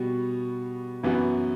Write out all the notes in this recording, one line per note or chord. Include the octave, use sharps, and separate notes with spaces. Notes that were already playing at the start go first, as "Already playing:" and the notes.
Already playing: B2 G3 B3 F#4
F#2 E3 B3 F#4